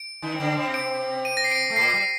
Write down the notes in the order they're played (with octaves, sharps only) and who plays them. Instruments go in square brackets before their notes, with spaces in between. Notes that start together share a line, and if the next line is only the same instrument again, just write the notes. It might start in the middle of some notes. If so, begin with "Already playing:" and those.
Already playing: [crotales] D7
[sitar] D#3 D#4
C4
D3 D4
C3 C4
[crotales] D7
D#7
A#6
C7
D7
[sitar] A3
[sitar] A#2 A#3 [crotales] C7
[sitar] G3